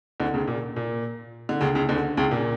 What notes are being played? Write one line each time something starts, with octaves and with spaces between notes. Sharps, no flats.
D2 D3
C#2 C#3
A#2
A#2
D3
C#2 C#3
C#2 C#3
D2 D3
C#2 C#3
A#2